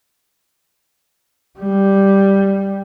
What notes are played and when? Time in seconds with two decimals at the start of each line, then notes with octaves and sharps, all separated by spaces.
1.60 G3